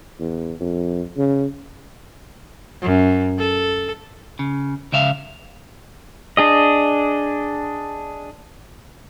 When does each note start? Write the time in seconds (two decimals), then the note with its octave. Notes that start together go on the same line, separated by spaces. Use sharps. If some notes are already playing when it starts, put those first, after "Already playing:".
0.20 E2
0.60 F2
1.17 C#3
2.82 F#2
3.38 A4
4.39 C#3
4.92 C#2 C#3 E5 F5
6.37 D4 G#4 D#5